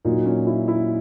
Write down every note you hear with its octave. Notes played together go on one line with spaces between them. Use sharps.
A#2 F#3 D#4
C#4
E4
E4